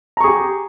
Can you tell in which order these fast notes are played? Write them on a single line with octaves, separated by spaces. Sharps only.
A#5 C#6 G#4 G4